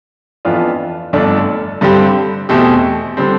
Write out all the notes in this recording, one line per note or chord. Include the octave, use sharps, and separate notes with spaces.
F2 E3 B3 D4 F4
G1 F2 D3 A3 D4
G2 D3 G3 C4 G4
E2 B2 A3 C4 G4
D3 G3 C4